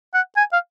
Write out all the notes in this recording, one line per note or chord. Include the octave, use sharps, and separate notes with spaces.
F#5
G#5
F5